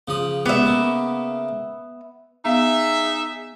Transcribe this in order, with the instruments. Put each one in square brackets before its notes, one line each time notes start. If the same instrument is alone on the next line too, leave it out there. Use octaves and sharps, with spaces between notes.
[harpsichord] C#3 F3 D#6
[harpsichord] C#2 G4 [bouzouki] B3 E5
[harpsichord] C#3 A#3
[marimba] B3 F5 [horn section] D#4 G#4 E5